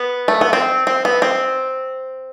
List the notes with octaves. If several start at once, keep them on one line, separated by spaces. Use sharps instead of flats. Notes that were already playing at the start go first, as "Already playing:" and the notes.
Already playing: B3
A3
B3
C4
C4
B3
C4